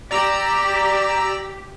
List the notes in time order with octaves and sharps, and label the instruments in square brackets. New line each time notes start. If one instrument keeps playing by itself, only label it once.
[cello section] G4 [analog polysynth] D5 A#5 E6